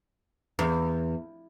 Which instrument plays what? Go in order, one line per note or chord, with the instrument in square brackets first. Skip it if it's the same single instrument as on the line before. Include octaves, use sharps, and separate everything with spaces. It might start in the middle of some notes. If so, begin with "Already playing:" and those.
[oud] E2